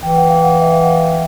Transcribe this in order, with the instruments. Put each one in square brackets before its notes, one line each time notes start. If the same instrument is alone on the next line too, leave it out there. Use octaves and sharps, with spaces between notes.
[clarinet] E3 [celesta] G5
[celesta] F#5
F5
F#5
E5
F5
F#5